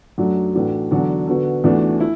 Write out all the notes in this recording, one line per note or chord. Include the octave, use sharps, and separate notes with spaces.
F#2 F#3 A3 D4 F#4
A2 E3 D4 F#4
E2 D3 F#3 D4 F#4
D3 B3 F#4
E2 E3 A3 D4 F#4
E4